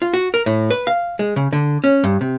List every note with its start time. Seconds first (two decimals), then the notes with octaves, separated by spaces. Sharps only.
0.02 F4
0.14 F#4
0.34 A#4
0.46 A2
0.70 B4
0.87 F5
1.19 G#3
1.36 C#3
1.53 D3
1.84 C#4
2.04 G2
2.21 C3